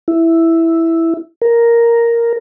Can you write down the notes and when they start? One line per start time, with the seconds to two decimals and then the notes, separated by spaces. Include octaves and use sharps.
0.08 E4
1.42 A#4